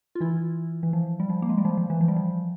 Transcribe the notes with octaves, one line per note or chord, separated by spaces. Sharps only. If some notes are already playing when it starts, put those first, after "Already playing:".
F4
E3 E4
E3
F3
G3
F3
A#3
G#3
G3
F3
F3
E3
F3
G3
F3